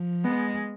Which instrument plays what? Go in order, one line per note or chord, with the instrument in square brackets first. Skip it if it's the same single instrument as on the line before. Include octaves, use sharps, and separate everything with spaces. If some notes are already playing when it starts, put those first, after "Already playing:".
Already playing: [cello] F3
[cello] G#3 [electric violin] B3